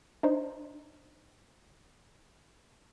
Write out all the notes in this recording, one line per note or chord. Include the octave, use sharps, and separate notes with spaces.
D4 D#4 C5